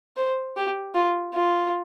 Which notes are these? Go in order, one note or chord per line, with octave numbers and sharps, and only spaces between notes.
C5
G4
F4
F4